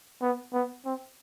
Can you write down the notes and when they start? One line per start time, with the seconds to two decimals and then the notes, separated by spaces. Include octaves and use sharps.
0.22 B3
0.53 B3
0.85 C4